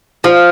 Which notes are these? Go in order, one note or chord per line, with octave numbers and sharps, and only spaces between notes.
F3